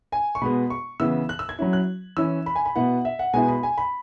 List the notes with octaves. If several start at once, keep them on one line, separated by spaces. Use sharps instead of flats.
G#5
C#6
B2 G#3 B3 B5
C#6
C#3 E3 B3 E4 E6
F#6
E6
G#6
F#3 C#4 E4
F#6
E3 C#4 E4 E6
B5
G#5
B5
B2 B3 E4 F#5
E5
F#5
B2 G#3 B3 E4 G#5
B5
G#5
B5